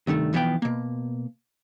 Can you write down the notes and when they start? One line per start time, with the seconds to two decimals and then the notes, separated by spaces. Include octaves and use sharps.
0.07 C2 G2 D#3 A3
0.33 B1 E3 F3 B3 F5 G5
0.62 B2 A#3